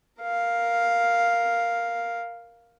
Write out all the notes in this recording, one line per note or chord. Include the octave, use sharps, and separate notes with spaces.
A#4 F5